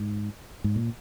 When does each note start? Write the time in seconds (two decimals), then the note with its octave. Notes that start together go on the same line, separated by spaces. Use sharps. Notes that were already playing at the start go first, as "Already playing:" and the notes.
Already playing: G#2
0.64 G#2
0.76 A#2